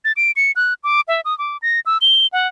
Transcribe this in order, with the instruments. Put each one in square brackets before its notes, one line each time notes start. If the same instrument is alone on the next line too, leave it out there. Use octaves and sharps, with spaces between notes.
[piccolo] A6
D7
C#7
F#6
D6
E5
D#6
D6
A#6
E6
G7
F#5